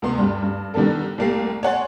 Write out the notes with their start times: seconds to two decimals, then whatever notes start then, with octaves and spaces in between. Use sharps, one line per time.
0.02 D2 C3 B3 C6
0.18 G2 G3
0.42 G2
0.74 D3 D#3 G3 B3 A4
1.18 C2 A3 A#3 G4 C7
1.63 C#5 D5 F#5 G#5 C6 A6